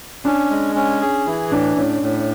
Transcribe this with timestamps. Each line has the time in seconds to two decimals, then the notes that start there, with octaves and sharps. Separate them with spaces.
0.25 C#4 D4
0.51 G#3
0.75 C#4
1.01 G#4
1.26 E3 E4
1.51 A2 D4
1.76 A2 C#4
2.02 A2